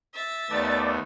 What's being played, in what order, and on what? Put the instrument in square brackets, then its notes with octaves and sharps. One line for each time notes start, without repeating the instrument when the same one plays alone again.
[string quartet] E5 A6
[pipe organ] D#2 B3 [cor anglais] A3 [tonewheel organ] D5 A5